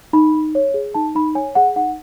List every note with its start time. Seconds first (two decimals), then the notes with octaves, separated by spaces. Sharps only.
0.13 D#4 B5
0.35 D#4
0.55 C#5
0.74 G#4
0.94 D#4 A5
1.15 D#4 B5
1.35 C#5 G#5
1.55 G#4 F#5
1.76 D#4 F#5